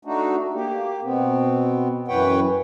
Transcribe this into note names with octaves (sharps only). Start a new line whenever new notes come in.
A3 D4 D#4 F#4
A#3 G4
B2 B3 C4
F#2 E3 B4 C#5 F#5 G5